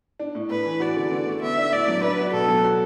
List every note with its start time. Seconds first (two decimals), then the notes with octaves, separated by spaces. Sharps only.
0.19 D4
0.35 A2
0.50 A2 B4
0.65 E3
0.80 F#4 D5
0.96 D3
1.11 D3
1.26 A3
1.41 B3 E5
1.57 D4
1.72 A2 D5
1.88 F#3
2.03 D4 B4
2.18 F#4
2.33 B2 A4
2.48 F#3
2.64 F#4